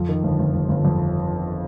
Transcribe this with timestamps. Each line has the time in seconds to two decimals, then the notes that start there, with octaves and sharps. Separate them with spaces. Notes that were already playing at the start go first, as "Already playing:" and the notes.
Already playing: F2 F3
0.09 D#3
0.24 G1
0.39 G1
0.54 G1
0.69 G1
0.85 F2